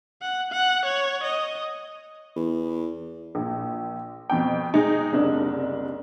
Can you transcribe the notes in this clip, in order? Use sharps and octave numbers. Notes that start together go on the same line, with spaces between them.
F#5
F#5
C#5
D#5
E2
A#1
F2 B2 G5
G#3 D#4
F#1 C2 D4